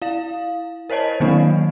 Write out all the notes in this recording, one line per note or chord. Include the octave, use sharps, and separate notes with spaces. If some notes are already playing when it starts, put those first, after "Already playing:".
E4 F5
A#4 C5 C#5 D#5 A5
D#3 F#3 A#3 C4 D4